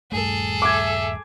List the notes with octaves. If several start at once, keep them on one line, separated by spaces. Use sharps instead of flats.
D#1 G2 A3 G#4 A4
E5 D6 G#6